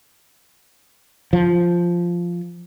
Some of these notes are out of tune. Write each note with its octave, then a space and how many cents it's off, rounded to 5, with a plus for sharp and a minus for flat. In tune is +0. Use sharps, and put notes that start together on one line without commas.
F3 -5